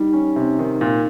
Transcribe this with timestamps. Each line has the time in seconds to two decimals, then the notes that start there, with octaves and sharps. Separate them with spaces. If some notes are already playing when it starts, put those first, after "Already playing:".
Already playing: G3 D#4
0.13 C#4
0.36 C3
0.59 D#3
0.81 A#2